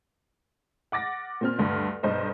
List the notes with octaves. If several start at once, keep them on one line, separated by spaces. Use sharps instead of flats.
F#5 D6 A6 A#6
A#2 C4 F6
D2 G2
B1 G2 C5 D#5